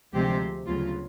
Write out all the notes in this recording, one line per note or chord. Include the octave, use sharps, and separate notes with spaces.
D2 C3 F3 G#3 C4 G4
D2 C#3 F#3 B3 F4